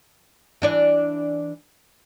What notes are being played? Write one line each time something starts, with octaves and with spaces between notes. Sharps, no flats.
E3 D4 D5